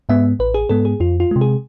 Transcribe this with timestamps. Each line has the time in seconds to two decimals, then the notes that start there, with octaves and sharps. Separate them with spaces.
0.09 G#2 G#3 B3 E5
0.39 A1 B4
0.54 G#4
0.69 G#2 G#3 B3 A4
0.85 G#4
1.00 F2 F4
1.20 F4
1.31 C3 G#3
1.41 G#4